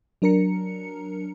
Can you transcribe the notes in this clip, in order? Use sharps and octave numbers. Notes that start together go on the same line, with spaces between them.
F#3 D4 A#4 A#5 C#7